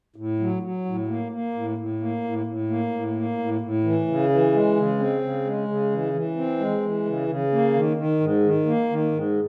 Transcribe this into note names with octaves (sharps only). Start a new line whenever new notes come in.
A2
F#3
F#3
A2
A#3
A#3
A2
A2
A#3
A2
A2
A#3
A2
A#3
A2
A2
E3
C#3
E3
G#3
C#3
C4
C#3
G#3
C#3
E3
E3
C4
G#3
E3
C#3
C#3
A#3
D#3
D#3
G#2
D#3
A#3
D#3
G#2